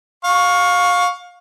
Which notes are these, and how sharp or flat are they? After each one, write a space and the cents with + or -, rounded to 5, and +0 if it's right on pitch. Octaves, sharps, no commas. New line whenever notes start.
F5 +25 C#6 +0